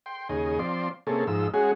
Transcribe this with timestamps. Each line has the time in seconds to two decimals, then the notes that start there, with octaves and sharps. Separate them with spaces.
0.06 G5 C6
0.29 D#2 C#3 G#4 D#5
0.59 F3 C4 D5 C6
1.07 C3 A#3 C#4 G#4 A4
1.27 G#2 F3 D#4 E6
1.54 G#3 C#4 F#4 G#4